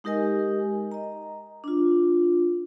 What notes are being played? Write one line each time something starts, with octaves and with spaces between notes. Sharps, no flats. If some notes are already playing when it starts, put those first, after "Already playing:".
G#3 D#4 G4 A#4 D#5 G#5
D#5 A#5
D4 F4